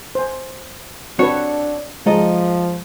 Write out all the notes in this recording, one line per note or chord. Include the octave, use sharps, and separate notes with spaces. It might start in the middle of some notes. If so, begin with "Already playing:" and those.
C5 G#5
C4 D4 F#4 A4 B4 C#5
F3 G#3 A4 D#5 A#5